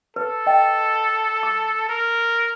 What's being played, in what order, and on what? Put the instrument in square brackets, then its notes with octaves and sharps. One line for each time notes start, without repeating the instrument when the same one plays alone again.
[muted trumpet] A4 [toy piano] B4
[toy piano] D#5 G5
D6
[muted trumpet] A#4